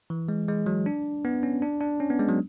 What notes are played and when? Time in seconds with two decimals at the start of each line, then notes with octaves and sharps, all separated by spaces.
0.10 E3
0.29 G#3
0.48 G#3
0.66 F#3
0.86 D4
1.25 B3
1.43 C#4
1.62 D4
1.81 D4
2.00 C#4
2.10 B3
2.19 G#3
2.29 F#3